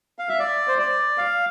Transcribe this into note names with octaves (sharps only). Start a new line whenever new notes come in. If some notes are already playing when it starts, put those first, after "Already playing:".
F5
E5
D5
C5
D5
F5